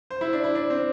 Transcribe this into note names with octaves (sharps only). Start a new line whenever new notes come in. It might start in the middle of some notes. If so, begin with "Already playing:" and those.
C5
E4
D4
E4
D4
C4